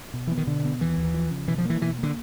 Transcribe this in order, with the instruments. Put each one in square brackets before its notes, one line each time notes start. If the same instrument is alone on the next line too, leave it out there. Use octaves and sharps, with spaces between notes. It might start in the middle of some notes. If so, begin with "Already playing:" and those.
[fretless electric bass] B2
[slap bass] E3 [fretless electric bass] B3
[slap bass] D#3
[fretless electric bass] B2 [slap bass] D3
[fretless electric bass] B3
[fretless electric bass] D#2 [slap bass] E3
[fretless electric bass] D#2
F3
C#3
[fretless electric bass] B2 [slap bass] E3
[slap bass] F3
[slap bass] E3 [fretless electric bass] A#3
[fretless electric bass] B2 [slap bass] E3
[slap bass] D3 [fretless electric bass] A#3